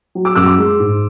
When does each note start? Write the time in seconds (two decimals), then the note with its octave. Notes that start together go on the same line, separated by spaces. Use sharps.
0.15 F#3
0.25 D6 E6
0.36 F#2 D6 E6
0.46 C6 D6
0.58 G#3
0.80 G#2